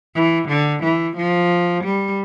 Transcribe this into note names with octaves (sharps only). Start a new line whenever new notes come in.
E3
D3
E3
F3
G3